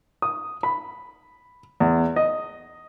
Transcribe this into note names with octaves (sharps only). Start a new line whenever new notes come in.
D#6
B5
E2
D#5